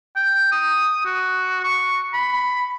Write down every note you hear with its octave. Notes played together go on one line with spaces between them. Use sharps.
G5
D#6
F#4
C#6
B5